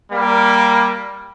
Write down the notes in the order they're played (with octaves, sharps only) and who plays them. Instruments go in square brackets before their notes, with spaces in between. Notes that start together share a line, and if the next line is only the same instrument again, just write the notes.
[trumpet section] G3 A#3